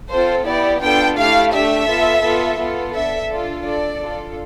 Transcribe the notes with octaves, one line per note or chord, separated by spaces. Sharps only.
C4 F4 A4 C5
B3 E4 G4 D5
B3 D4 F4 A4 G5
A3 E4 G4 F5
A3 D4 G4 E5
B3 F4 A4
B3 F4 A4
B3 F4 A4
D4 A4 E5
D4 F4 A4
D4 A4 D5
D4 F4 A4